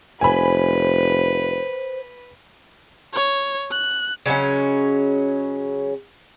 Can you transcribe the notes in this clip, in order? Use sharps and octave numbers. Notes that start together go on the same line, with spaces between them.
F1 B4 C5 G#5 B5
C#5
F#6
C#3 F#3 G#3 C#4